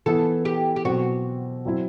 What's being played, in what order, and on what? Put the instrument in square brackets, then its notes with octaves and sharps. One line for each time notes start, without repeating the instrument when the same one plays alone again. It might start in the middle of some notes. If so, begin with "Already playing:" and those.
[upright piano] E3 B3 E4 [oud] A4
[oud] G4
G4
[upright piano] B2 F#3 C4 [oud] F#4
[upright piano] F#3 C4 E4